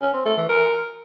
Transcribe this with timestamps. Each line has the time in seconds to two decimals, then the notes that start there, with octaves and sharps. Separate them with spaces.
0.02 C#4
0.14 C4
0.25 A3
0.37 E3
0.49 A#4